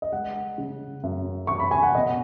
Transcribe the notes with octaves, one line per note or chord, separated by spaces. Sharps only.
D#5
G#3 F#5
C#3
F#2
F#2 C#6
B5
G#5
F#5
B2 D#5